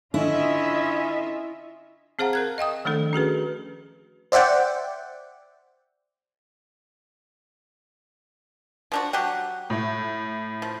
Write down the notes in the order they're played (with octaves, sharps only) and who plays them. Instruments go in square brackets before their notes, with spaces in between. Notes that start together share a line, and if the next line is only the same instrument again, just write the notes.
[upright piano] D3 [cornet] C#4 [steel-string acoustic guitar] E4 [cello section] F4 D#5 E5
[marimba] C4 G#4 C5 F5 F#5 A#5
A#4 F#6 G#6
D#5 F5 G5 D#6
D#3 F3 A3 D4 A4
C#4 F#4 G#4 B4
[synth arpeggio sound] C5 D5 E5 F#5 G5
[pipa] F3 D4 F#4
F#3 G4 F#5
[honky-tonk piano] A2
[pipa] F3